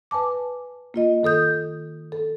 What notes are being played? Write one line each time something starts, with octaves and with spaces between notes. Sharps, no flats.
B4 G#5 A5 D6
A#3 F4 D#5
D#3 A4 D#6 G6
A4